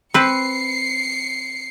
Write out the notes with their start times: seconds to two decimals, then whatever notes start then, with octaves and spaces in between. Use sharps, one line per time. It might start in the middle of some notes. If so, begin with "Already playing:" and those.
0.14 C4 B4 C7 C#7